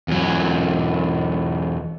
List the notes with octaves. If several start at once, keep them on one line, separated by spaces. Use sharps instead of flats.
E2 F#3